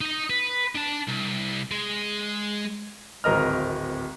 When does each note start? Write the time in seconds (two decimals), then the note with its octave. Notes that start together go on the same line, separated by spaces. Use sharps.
0.01 D#4 D#5
0.30 B4
0.76 D4 A5
1.08 C2
1.71 G#3
3.24 D1 G#1 A#4 D#5 F6